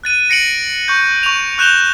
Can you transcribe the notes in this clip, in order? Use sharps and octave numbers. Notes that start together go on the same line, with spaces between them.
F#6 A6 D#7
A#6 C#7 D7 F#7
C#6 G6
C#6 F7
C#6 F#6 G6 E7 F7 G7